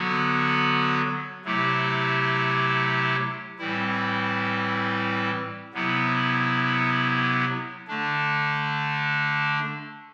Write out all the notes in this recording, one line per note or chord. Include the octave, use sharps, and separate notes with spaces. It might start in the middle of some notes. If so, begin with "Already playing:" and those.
Already playing: D3 F#3 B3 F#4
C3 F#3 A3 E4 G4
A2 E3 G3 C4 E4
C3 F#3 B3 E4
D3 A3 D4